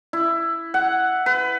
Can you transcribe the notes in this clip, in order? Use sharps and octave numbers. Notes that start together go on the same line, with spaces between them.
E4
F#5
B4